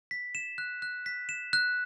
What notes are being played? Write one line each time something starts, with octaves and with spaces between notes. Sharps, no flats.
B6
E7
F#6
F#6
B6
E7
F#6